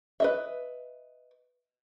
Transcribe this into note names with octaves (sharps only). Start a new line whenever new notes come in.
B4 D#5 E5